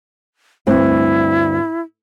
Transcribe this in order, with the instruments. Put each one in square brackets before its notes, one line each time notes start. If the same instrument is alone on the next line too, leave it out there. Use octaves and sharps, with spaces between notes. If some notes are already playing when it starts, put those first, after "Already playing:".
[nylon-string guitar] D2 G2 C4 [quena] E4